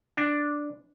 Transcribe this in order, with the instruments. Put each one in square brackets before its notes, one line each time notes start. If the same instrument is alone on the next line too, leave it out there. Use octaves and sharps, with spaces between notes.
[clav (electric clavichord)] D4